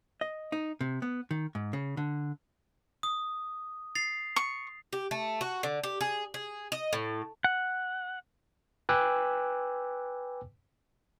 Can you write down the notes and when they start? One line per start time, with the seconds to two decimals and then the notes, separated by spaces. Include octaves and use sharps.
0.21 D#5
0.52 D#4
0.81 C3
1.02 B3
1.31 D#3
1.55 G#2
1.73 C#3
1.97 D3
3.03 D#6
3.95 A6 C7 F7
4.36 C#6
4.93 G4
5.11 A3
5.41 F#4
5.63 D3
5.83 G4
6.01 G#4
6.34 G#4
6.72 D#5
6.93 A2
7.44 F#5
8.89 B4 G5 G#5 D6 E6 F#6